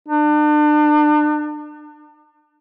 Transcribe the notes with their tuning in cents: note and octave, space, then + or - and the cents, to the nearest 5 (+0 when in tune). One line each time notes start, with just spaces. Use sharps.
D4 +35